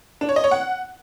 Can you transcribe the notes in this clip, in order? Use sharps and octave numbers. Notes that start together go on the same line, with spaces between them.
D4
C#5
D#5
C#5
F#5